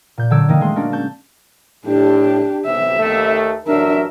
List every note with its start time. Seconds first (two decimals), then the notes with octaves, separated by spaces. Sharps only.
0.18 A#2 G6
0.30 D3 F#3 A4 E6 G#6 D7
0.49 D#3 A#3 D#4
0.61 G#3 A3 C6
0.76 A#3 C#4 D4 F#4
0.92 A5 C#6 G6
1.85 A2 D4 G4
2.66 B1 C3 E5
2.99 D#2 A3
3.66 A1 F#3 D4 A#4 E5